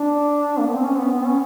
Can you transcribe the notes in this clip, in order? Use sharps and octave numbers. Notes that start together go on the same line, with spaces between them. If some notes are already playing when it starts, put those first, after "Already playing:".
Already playing: D4
A#3
B3
C4
C#4
B3
B3
C#4